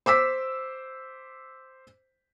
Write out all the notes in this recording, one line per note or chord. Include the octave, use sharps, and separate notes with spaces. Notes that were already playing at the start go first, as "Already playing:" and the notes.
C5 D6 E6 B6